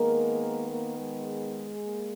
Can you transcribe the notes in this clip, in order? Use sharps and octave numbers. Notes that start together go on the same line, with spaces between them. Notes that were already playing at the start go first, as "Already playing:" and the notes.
Already playing: D#3 G#3 A#3 B3 A#4
A#3 A#4
G#3 G#4
A#3